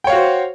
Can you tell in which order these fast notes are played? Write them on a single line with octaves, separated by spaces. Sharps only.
G5 C#5 F5 F#4 C5